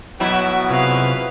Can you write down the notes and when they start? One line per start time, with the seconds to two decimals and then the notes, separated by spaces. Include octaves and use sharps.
0.20 B2 F#3 B3 E4 F#4
0.69 C3 F4 G#4 B4 F5